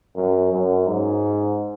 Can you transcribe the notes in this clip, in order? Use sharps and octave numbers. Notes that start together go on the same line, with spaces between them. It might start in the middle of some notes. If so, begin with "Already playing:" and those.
F#2
F#2
G#2